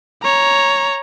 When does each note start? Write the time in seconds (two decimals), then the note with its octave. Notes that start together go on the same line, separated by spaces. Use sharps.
0.23 C#5 A#5